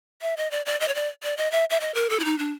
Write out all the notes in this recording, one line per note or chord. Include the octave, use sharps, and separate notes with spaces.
E5
D#5
D5
D5
D#5
C#5
D5
D5
D#5
E5
E5
D#5
A#4
A4
E4
D#4
D4